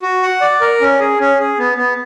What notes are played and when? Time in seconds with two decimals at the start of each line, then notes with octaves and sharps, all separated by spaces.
0.02 F#4
0.23 F#5
0.41 D5
0.61 A#4
0.81 C#4
1.00 G#4
1.20 C#4
1.40 G#4
1.59 B3
1.78 B3